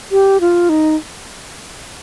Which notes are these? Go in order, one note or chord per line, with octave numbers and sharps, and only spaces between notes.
G4
F4
D#4